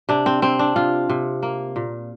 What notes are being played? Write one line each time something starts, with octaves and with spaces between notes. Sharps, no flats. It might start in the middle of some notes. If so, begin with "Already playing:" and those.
C3 D4
C4
C3 C4
D4
C3 F4
C3
A#3
A#2